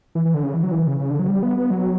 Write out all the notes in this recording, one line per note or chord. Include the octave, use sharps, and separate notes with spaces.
E3
E3
D3
C#3
E3
F#3
E3
C#3
C#3
D3
F#3
G3
B3
B3
F#3